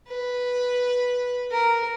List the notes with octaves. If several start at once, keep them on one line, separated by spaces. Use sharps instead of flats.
B4
A#4